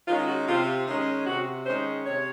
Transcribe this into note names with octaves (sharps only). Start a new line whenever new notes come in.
D#3 G#3 C#4 F4
F#4
C3 F4
D#3 G#3 C#4
C3 F#4
D#3 G#3 C#4 C5
C3 C#5